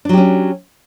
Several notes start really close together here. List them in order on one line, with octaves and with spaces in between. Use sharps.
D4 F#3 G4 C#4